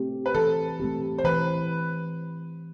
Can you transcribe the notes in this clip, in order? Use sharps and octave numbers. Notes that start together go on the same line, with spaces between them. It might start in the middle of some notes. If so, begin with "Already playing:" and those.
Already playing: A3 C4 G4
B4
E3 A4
A3 C4 G4
C5
E3 B4